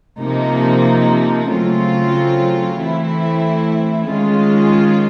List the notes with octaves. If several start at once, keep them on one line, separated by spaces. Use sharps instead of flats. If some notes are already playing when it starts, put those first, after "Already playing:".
C3 F3 A#3 D#4
C#3 F#3 A3 C4 F4
E3 A3 C4 E4
D#3 G#3 C#4 F4